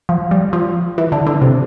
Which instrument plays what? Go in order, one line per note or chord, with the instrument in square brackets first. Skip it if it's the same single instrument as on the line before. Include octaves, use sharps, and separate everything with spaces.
[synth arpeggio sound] F3
G3
F3
E3
D3
D3
C3